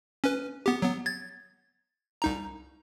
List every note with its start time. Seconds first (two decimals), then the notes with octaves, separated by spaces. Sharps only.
0.24 C#4 B4
0.66 B3 G4
0.82 F#3 B3
1.06 G#6 A6
2.22 C2 D#4 A#5